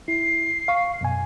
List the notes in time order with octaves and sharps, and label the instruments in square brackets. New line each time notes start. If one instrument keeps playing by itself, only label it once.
[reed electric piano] E4 [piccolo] C7
[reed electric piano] F5 C#6
F#2 B2 G#5